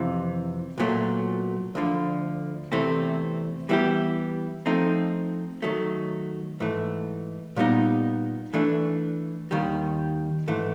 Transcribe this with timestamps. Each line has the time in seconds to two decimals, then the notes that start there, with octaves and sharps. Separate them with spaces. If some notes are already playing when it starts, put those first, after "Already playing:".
Already playing: F2 C3 E3
0.78 B1 A#2 F#3 A3
1.75 D2 D3 F3
2.72 E2 C3 E3 A3 C4
3.69 E3 G3 B3 E4 G4
4.66 F3 A3 C4 D#4
5.62 D#3 F#3 A3
6.60 G#2 E3 A3
7.56 A#2 G3 B3 D#4
8.54 E3 A3 D4
9.51 D#2 D#3 G3
10.48 G#2 E3 A3